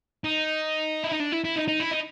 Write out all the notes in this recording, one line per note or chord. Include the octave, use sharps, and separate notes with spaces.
D#4
E4
D#4
D4
E4
E4
D#4
D#4
E4
D#4